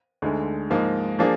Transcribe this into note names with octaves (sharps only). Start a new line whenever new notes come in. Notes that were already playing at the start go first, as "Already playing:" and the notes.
D2 D3 G#3 D#4
G#2 F3 A#3 D#4
F3 A#3 D4 G#4